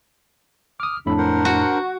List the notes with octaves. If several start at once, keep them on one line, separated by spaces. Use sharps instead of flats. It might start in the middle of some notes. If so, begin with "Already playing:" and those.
D6 D#6 F6
F2 A2 D4 E4 B5
A#4 C5 F#5
F#4